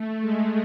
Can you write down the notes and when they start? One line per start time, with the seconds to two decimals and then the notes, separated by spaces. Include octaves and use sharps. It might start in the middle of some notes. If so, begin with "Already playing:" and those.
Already playing: A3
0.21 G#3